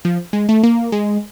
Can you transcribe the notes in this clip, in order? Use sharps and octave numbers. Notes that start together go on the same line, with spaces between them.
F3
G#3
A3
A#3
G#3